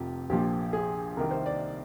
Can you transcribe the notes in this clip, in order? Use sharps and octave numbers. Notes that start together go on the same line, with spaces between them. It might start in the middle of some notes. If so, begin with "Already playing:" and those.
Already playing: F1 F2 C3 F4 G4
A#1 A#2 F3 G4
G#4
C2 C3 D#3 A#4
C5
D5